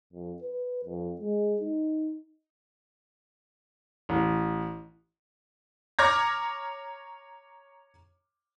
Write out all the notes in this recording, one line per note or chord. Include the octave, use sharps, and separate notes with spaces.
F2
B4
F2
G#3
D#4
A1
C#5 A#5 D6 F6 G#6 A#6